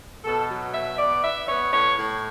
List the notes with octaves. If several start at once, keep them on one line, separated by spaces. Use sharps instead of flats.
B2 A4
F#3
B2 E5
B3 D5
E4 E5
B3 C#5
A2 C#5
A2